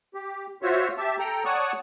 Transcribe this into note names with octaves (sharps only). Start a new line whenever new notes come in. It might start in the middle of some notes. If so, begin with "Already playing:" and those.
G4
F4 F#4 C5 C#5 E5
G4 E5 A5
A4 G5 A#5
C#5 D5 F#5 A5 C#6 D#6